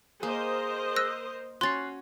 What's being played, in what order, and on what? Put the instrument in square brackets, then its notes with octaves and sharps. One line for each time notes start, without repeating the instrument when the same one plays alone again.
[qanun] A#3 [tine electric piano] G#4 [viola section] A#4 C5 D#5
[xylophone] E6 F#6 A#6
[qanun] C#4 F#4 [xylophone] C6 A6 [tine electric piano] F#6 C7